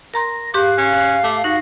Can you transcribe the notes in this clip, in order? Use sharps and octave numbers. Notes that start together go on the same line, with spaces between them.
A#4 A#5 C6 A#6
G#2 G4 F5 D6 F#6
C#4
A3 D6
D#4 F#4 A#6